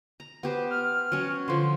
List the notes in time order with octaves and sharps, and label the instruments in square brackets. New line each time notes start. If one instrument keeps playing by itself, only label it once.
[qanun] A#5
B3 G4 C5
[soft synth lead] F6
[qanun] F#3 C#4
[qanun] D3 F3 [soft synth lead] C6